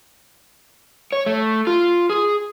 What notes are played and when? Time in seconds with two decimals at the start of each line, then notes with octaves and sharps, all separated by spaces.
1.12 C#5
1.26 A3
1.67 F4
2.09 G#4